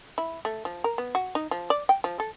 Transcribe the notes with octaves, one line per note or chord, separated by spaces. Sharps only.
E4
A3
F3
A#4
B3
F#4
D#4
F3
D5
G5
F3
A4